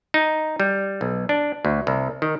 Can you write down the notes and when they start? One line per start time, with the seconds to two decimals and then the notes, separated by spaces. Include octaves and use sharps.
0.14 D#4
0.60 G3
1.01 B1
1.29 D4
1.65 D2
1.87 C2
2.22 D#3